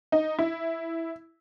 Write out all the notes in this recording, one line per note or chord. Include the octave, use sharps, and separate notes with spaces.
D#4
E4